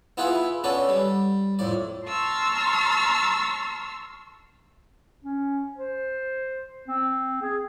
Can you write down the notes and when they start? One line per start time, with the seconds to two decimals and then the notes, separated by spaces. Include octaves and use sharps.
0.17 B3 E4 F4 G#4 B4 E5
0.64 B3 C#4 D4 A4
0.89 G3
1.59 F2 A2 D5
2.06 A5 A#5 C6 C#6 E6 F6
5.24 C#4
5.76 C5
6.88 C4
7.42 G#4